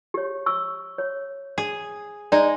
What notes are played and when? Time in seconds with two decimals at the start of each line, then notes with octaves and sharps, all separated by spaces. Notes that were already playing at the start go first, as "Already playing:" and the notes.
0.14 G4 C#5
0.46 C#6 E6
0.98 C#5
1.58 G#4
2.32 G#3 D#4 D5